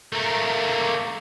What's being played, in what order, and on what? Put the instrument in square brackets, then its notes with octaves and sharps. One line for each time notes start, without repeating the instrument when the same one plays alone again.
[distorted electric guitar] A3 A#3